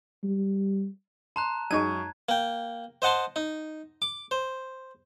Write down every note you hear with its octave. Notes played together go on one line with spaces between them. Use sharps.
G3
A5 A#5 C6 F#6
F#2 G#3 D#4 C#6 G#6 D#7
A#3 G5
C5 D#5 F#5 A5 C6
D#4
D6
C5